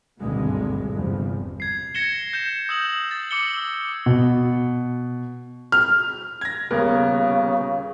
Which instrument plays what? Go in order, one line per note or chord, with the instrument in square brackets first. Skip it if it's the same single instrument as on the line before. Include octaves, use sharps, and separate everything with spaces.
[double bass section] G#1 D2 G2 B2 D3 G#3
G1 E2 C3 F3
[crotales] G#6 C7
G#6 A#6 C7 C#7 E7 G7
G6 E7
D#6 E6 G6 E7 F#7
A6
D6 E6 C#7 G7
[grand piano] B2
F6
[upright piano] G#6 A#6
[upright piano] D#1 B3 A#4 [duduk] C#3